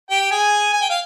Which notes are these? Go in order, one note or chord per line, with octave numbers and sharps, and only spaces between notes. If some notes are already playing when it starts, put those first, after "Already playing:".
G4 G5
G#4 G#5
G#5
G5
F5